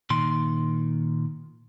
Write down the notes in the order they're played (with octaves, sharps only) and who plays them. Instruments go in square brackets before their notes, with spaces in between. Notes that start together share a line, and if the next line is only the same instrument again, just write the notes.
[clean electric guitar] A#2 D#3 C6